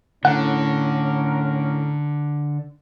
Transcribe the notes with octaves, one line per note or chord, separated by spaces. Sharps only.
A2 D3 C#4 A#4 F#5